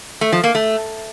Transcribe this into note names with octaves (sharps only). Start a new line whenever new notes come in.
A3
F3
A#3
A3